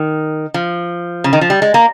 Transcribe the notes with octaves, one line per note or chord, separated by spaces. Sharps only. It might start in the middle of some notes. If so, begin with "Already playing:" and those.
Already playing: D#3
F3
C#3
D#3
F3
G3
G#3
A#3